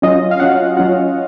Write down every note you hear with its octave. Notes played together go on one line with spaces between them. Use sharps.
F#3 C#4 F4 D#5
F5
F#3 C#4 F4 F#5
F#3 C#4 F4 F#5